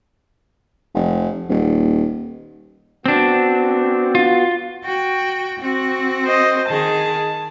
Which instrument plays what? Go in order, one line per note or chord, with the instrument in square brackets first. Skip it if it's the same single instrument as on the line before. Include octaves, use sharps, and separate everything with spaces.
[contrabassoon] F1
D#1
[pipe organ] B3 F#4 [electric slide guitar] C4 D4
[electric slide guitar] F4
[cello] F#4 G5
C4 F#4
[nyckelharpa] C5 D#5
[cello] D#3 G#4 [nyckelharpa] A5